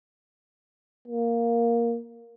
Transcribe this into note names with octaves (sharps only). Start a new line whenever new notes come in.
A#3